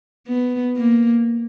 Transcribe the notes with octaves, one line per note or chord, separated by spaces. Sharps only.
B3
A#3